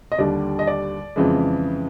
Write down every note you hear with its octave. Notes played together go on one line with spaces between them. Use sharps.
D#5
D#2 D3 G3 D5
D#5
D5
F2 C#3 E3 G#3